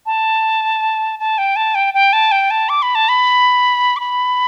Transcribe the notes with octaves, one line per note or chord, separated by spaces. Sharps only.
A5
A5
G5
A5
G5
G5
A5
G5
A5
D6
B5
A5
B5
D6
B5